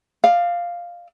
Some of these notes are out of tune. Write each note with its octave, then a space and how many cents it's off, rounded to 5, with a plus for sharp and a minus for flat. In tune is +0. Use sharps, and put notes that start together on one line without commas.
D5 +35 F5 +0